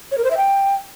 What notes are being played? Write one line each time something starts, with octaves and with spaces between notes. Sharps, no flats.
C#5
A#4
C5
E5
G5